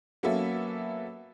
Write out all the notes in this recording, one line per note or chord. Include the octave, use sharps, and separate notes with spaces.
F#3 A#3 B3 C#4 A4 E5